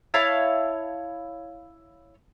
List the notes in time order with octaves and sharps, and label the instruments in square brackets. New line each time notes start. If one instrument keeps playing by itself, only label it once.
[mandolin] E4 C#5 F5 A5